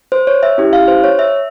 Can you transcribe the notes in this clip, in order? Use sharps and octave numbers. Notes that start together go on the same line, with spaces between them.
C5
C#5
E5
C#4 E4 G4
F5
C5
C#5
E5